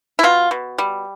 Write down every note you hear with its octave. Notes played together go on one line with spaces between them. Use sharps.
E4
B2 F4
B2
G3